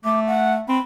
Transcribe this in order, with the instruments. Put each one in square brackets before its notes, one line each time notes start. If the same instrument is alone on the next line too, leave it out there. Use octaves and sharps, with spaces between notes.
[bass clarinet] A3 [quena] D6
[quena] F#5
[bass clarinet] C4 [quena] B5